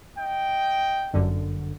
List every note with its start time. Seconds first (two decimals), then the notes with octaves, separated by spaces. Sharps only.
0.18 D#5 G5
1.13 G1 F#2 D3